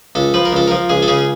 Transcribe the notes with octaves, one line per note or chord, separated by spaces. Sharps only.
C#2 A4
F3 B4
A#4
C#2 A4
F3 A#4
C#2 G#4
A4
C#3 G#4